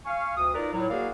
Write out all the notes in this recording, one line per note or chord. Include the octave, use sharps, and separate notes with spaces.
F5 G#5 C#6
D2 D#6
D#4 F4 A#4 B4 D5
A2 F#3
A#3 F#4 G#4 A#4 D5 F5